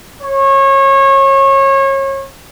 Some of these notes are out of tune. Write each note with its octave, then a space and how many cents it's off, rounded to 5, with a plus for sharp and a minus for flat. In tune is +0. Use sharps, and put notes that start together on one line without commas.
C#5 -30